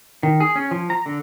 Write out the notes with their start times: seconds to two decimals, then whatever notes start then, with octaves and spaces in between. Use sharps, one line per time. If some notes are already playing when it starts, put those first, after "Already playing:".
0.23 D#3
0.40 G#4
0.56 C#4
0.71 F3
0.90 A#5
1.06 D3